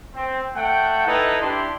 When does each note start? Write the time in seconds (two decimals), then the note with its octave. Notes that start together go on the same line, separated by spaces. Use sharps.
0.15 C4
0.55 A3 F#5 G5
1.06 D#4 E4 A4 B4
1.41 D4 E4 G4 C6